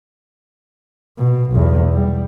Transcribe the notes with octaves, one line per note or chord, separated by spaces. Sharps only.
B2
B1 E2
G3